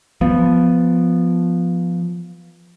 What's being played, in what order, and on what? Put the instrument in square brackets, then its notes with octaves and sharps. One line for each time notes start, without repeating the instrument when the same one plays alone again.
[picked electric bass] F3 B3